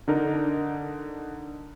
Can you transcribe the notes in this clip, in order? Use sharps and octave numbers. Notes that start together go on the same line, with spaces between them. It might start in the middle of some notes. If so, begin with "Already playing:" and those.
D3 D4 D#4 A#4